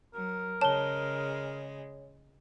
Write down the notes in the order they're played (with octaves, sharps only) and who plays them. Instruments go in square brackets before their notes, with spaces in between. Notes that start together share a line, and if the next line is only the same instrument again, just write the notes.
[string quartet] F#3 [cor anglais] A#4
[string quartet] C#3 G#3 [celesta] C#5 G7 [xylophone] A5